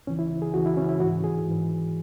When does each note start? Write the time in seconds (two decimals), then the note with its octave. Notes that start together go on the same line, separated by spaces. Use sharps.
0.07 C#2 C#3 E3 C#4
0.19 E4
0.42 G#4
0.54 C#2 C#3 E3 F#4
0.66 E4
0.77 C#4
0.89 E4
1.00 G#2 E3 F#4
1.24 G#4
1.47 G#2 E3